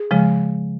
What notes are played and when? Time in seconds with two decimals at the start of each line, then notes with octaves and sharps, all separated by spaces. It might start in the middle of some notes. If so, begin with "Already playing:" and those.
Already playing: G#4
0.11 C#3 F3 G#3